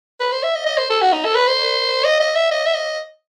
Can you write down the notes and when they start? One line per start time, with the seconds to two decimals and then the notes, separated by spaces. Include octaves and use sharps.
0.20 B4
0.32 C5
0.43 E5
0.55 D#5
0.66 D#5
0.78 C5
0.90 A4
1.02 F#4
1.13 D#4
1.25 A4
1.35 B4
1.48 C5
2.05 D#5
2.20 D#5
2.35 E5
2.51 D#5
2.66 E5
2.74 D#5